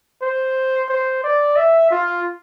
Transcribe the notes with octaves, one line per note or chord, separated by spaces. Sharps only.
C5
C5
D5
E5
F4